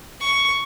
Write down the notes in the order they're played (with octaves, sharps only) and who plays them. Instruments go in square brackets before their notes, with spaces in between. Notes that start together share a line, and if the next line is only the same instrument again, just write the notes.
[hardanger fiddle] C#6